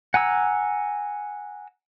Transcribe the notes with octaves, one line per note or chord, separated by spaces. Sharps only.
F#5 G#5 A#5 E6